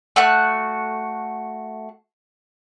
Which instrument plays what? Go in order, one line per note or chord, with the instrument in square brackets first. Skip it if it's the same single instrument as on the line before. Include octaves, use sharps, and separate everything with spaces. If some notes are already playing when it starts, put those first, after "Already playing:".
[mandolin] A3 F#4 F#6